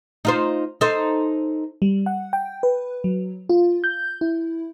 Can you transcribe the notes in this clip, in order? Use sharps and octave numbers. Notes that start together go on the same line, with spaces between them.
D#4 F4 C5
D#4 A4 C5
G3
F#5
G5
B4
F#3
F4
G6
E4